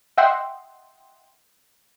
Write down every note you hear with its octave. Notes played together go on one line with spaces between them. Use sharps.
D#5 E5 F#5 G5 C6